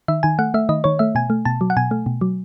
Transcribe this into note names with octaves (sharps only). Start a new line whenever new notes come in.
D#3 E5
D#3 G#5
A3 F#5
A3 E5
D#3 D#5
D#3 C#5
A3 E5
B2 G#5
A3
B2 A5
F#3
F#5
B2 G#5
A3
B2
F#3